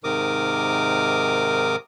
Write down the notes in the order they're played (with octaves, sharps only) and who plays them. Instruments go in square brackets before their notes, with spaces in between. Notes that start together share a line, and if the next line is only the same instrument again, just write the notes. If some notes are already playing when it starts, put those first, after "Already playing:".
[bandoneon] G#2 C3 D#3 A#4 D6 D#6